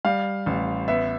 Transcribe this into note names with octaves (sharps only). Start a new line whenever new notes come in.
G3 F5
A1
B3 E5